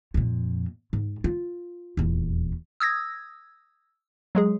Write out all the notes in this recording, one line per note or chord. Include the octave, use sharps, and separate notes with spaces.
F2 A#2
G#2
F4
D#1 E2
D#6 E6 G#6 A#6
F#3 G#3 G#4